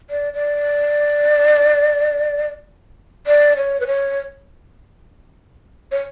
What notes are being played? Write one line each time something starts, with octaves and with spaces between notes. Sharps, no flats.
D5
D5
D5
C#5
B4
C#5
C#5